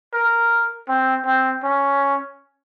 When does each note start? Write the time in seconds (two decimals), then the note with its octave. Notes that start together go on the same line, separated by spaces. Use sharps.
0.14 A#4
0.88 C4
1.26 C4
1.64 C#4